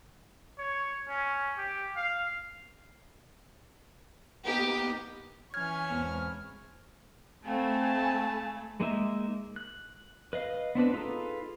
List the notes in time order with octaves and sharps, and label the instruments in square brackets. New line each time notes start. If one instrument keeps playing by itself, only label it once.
[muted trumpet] C#5
C#4
G4
F5
[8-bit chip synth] A#3 B3 D#4 [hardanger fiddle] G4
[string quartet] E3 C#4 C#5 [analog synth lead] F6 [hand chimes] G#6
[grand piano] E1 G#2 C4
[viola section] A3 [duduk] C4 [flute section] F5 G#5 B5 [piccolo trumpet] A5
[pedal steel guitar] G#3 A#3 D#4 E5
F#6
B4 D#5 F5
B3 C4 D4 B4
D#4 F4 G#4 A4 B4